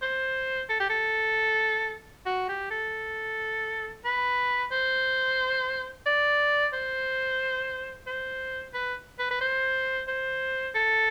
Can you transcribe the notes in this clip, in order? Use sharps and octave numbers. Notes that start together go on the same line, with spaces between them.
C5
A4
G4
A4
F#4
G4
A4
B4
C5
D5
C5
C5
B4
B4
B4
C5
C5
A4